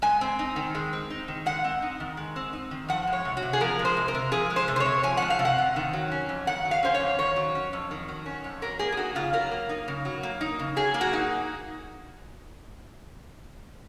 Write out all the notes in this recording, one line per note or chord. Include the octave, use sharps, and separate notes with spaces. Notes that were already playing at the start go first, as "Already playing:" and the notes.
G#3 G#5
C4
D#4
D#3
G#3
C4
D#4
D#3
G#3 F#5
C4
D#4
D#3
G#3
C4
D#4
D#3
F3 F#5
G#3
C#5
C3
F#4
C3
G#4
F3 A#4
G#3
C5
C3
A#4
C3
F3 G#4
G#3
C5
C3
C5
C#5
C3
F3 G#5
G#3 F#5
F5
C3
F#5
C3
D#3
F#3
C#4
F2
D#3 F#5
F#3
F5
C#4 C5
C#5
F2
D#3 C#5
F#3
C#4
F2
D#3
F#3
C#4
F2
F#3 A#4
A#3 G#4
G#4
D#4 F#4
C#3 F4
F#3 A#4
A#3
D#4
C#3
F#3
A#3
D#4
C#3
F#3 G#4
A#3
F#4
D#4